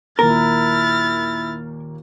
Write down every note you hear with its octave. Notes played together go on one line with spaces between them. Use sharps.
D#2 A#2 A#3 E4 A#4 F6 A6